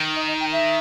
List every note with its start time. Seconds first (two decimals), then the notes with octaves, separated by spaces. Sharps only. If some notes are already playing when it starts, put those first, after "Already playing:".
Already playing: D#3
0.16 D#5
0.28 D#5
0.40 G5
0.52 E5